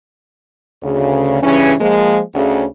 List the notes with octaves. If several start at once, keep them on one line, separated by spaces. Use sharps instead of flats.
D2 C#3
G2 C#3 E3 C#4
F3 G#3 A#3
D2 C#3